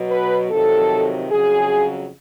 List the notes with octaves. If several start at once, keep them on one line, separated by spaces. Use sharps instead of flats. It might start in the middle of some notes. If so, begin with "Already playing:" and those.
Already playing: B2 F#3
B4
F2 C3 D#3 F#3 A4
F2 C#3 F#3 G#4